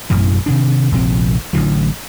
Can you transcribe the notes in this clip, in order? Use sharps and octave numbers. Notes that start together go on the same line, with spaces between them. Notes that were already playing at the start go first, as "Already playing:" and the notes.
A1 F#2 B2 E3
C3 D#3 D4
F1 A#1 F3 C4
A1 D3 E3 F#3